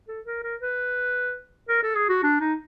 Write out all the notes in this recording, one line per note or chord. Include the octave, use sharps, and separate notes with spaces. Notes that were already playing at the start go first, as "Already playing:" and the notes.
A4
A#4
A#4
B4
A#4
A4
G#4
F#4
D4
D#4